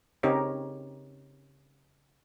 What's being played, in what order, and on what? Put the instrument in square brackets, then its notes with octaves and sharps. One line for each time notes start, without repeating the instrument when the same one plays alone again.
[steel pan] C#3 C4 D#4 G4 A#4 C#5